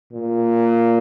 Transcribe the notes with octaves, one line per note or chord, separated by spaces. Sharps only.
A#2